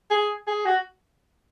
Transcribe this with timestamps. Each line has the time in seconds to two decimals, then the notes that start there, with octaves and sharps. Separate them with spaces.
0.11 G#4
0.47 G#4
0.65 F#4